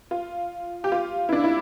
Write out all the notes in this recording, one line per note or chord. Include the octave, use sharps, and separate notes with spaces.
F4
G4
F4
E4
D4
E4